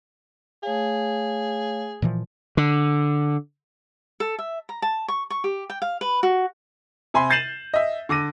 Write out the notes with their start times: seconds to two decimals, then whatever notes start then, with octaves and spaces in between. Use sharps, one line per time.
0.63 A3 G#4 C#5 F5
2.02 A#2 E3 F3
2.57 D3
4.20 A4
4.39 E5
4.69 A#5
4.82 A5
5.08 C#6
5.30 C#6
5.44 G4
5.70 G5
5.82 F5
6.01 B4
6.23 F#4
7.14 C3 G#5 B5 C6
7.30 G6 A6 C7 D#7 E7 F#7
7.74 D#5 E5
8.09 D3 D6 A#6 D#7